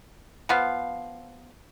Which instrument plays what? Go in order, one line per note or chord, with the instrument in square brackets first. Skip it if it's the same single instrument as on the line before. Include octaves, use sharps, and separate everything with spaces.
[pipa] F3 B3 F5